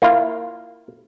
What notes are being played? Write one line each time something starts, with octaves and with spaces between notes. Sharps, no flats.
A#3 E4 F4 F5